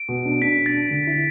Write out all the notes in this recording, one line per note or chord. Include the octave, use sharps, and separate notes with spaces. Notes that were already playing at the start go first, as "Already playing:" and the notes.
Already playing: D7
B2
D4
D4 B6
D4
A6
D4
D3
E4